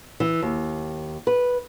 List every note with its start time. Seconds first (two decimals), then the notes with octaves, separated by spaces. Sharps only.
0.20 E3
0.42 D#2
1.27 B4